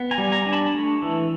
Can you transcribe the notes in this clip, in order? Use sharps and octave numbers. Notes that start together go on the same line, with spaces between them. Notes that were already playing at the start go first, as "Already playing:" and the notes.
Already playing: B3
G#5 A#5
G3
G#5 A#5
D4
A5 B5
A3
E3